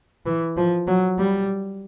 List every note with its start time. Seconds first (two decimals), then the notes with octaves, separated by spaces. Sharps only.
0.26 E3
0.57 F3
0.87 F#3
1.19 G3